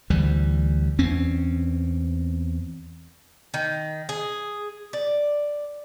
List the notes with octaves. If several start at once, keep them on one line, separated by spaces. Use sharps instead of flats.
D2 E3 G3
E2 C4 C#4
D#3
G#4
D5